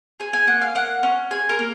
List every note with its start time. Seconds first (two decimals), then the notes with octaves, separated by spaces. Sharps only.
0.20 G#4 G#5
0.33 G#5
0.47 A#3 F#5
0.61 F5
0.75 A#3 F#5
1.03 C#4
1.31 G#4 G#5
1.49 A#4
1.59 A#3